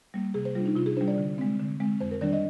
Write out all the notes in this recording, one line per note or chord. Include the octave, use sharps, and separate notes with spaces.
G3 A#3
C3 G#4
C5
G3 D4 F4
D#4
C3 F4
G#4
G3 D4 C5
D5
D3
G#3 C4
D3
G#3 C4
F2 C5
A#4
D#3 G3 D4 D5
D#5